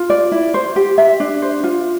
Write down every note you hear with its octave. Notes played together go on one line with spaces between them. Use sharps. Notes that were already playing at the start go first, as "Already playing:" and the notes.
Already playing: F4
D5
E4
C5
G4
E5
D4
C5
F4